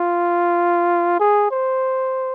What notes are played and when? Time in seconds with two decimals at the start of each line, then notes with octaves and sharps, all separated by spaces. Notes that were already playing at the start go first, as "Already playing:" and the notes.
Already playing: F4
1.20 G#4
1.51 C5